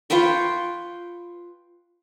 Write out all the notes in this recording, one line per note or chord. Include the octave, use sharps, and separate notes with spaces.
F4 B4 G5 C#6